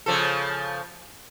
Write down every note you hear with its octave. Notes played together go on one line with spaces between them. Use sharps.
C#3 F3 A4